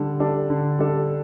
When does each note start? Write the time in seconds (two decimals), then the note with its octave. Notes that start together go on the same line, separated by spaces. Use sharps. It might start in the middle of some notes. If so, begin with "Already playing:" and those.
Already playing: D3 G3 D4 A4
0.20 G3 D4 A4
0.50 D3
0.79 G3 D4 A4